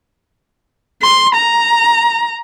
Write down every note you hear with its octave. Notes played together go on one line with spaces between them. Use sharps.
C6
A#5